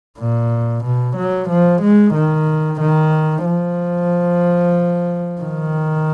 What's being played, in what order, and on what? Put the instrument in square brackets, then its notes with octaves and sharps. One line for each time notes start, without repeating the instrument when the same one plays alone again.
[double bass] A#2
B2
F#3
F3
G#3
D#3
D#3
F3
D#3